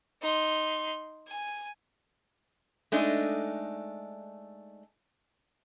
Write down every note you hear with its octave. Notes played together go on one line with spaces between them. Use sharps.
D#4 C6
G#5
G#3 A3 D4 D#4